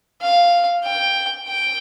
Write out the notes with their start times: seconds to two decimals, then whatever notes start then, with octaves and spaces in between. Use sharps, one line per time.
0.21 F5
0.84 G5
1.48 G5